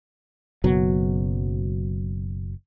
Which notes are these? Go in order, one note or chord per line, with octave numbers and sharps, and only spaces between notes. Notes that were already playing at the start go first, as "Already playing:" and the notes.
F#1 B2 F#3